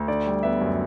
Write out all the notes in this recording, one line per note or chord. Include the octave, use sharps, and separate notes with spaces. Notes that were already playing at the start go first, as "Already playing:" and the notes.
Already playing: D2
D3 D5
G3
B3 E5
F#2